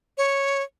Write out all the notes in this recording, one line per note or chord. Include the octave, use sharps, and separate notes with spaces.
C#5